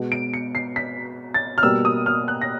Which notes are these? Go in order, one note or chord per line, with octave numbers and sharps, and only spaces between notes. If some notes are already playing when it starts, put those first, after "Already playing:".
Already playing: B2 G#3 B3
D7
C#7
C7
B6
A6
F6
B2 G3 A#3 E6
D#6
F6
F#6
A#6